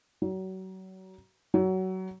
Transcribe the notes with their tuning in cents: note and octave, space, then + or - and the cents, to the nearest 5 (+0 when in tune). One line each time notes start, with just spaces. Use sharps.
F#3 +30
F#3 +20